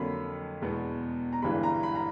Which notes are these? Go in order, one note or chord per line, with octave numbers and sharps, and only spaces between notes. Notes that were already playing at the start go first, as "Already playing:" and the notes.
Already playing: F2 D3 F#3 A#3 B5
E2 B2 G#3 B3
A#5
G1 G2 E3 G#3 B5
A#5
B5
A#5